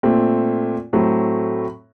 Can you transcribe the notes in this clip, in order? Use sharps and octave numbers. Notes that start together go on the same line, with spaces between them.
A#2 A3 C4
A2 F#3 A3 C4